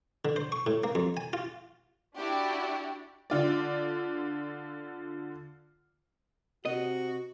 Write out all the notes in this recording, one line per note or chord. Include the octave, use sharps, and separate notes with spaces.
D3
C5
C#6
A2
A#3
F2
G#5
F4
D4 E4 F#4 G4
D3 F4 D5
C3 F#4 D#5